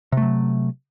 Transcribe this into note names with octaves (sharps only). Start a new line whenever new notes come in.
C3 F#3 A3